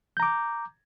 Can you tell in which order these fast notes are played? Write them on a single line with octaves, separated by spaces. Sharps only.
G6 A#5 D6